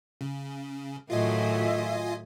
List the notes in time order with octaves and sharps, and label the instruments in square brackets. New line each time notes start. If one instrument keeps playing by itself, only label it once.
[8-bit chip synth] C#3
[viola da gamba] A2 D#3 F#3 [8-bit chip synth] F4 D#5 G#5 [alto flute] E5